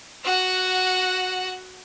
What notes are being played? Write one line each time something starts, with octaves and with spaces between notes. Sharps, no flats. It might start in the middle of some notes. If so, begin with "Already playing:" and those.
F#4 F#5